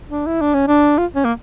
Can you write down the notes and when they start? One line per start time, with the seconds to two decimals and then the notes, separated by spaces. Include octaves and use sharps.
0.10 D4
0.27 E4
0.41 D4
0.54 C#4
0.68 D4
0.98 F4
1.16 C#4
1.25 A#3